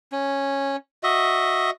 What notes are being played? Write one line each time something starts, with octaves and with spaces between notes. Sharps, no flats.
C#4
F#4 D#5 E5